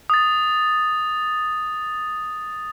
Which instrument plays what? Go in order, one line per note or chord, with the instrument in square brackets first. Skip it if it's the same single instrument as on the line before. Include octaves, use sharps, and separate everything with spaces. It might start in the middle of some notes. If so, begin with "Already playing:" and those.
[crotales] D#6 A6